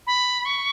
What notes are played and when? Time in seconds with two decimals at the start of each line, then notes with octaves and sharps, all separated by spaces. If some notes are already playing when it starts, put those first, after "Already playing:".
0.07 B5
0.45 C#6